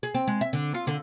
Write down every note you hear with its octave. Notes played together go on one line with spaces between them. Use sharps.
G#4
C4
G#3
E5
D3
F4
D3